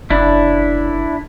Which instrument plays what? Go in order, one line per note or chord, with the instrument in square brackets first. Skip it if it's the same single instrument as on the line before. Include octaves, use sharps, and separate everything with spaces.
[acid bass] F#1 [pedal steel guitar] D4 E4